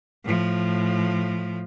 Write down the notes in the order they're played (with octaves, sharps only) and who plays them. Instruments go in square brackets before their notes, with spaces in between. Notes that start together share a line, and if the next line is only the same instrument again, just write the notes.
[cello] A2 F3